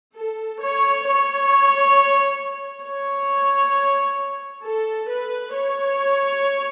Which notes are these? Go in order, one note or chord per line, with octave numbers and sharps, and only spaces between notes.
A4
C#5
C#5
C#5
A4
B4
C#5